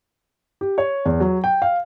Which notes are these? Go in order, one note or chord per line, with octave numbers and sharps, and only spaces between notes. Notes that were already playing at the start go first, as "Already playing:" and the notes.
G4
C#5
E2
F#3
G5
F5